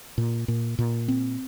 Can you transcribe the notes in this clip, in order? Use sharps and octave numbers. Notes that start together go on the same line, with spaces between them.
A#2
A#2
A#2
C4